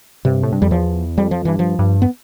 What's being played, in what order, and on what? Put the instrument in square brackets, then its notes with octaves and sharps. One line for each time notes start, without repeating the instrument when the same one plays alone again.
[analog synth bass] G2 [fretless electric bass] C3
[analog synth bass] A2
G2
[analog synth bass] F2 [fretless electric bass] G3
[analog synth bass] E2 [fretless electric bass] F3
[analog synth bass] F2 [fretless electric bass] G3
[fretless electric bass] F3
[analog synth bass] G2 [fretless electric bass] E3
[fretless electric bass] F3
[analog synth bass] G2
[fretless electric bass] B3